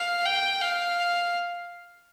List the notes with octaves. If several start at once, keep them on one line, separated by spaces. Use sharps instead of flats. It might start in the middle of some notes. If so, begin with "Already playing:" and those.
Already playing: F5
G5
F5